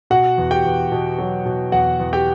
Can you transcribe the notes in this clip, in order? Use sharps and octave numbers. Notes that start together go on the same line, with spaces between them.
B2 F#4 F#5
E2
G4 G5
E2
B2
F#3
B2
E2 F#4 F#5
E2
G4 G5